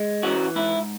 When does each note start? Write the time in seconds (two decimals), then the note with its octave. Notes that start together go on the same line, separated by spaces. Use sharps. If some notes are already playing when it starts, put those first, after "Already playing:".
Already playing: G#3
0.23 E3 C#4 F#4
0.55 G#2 E4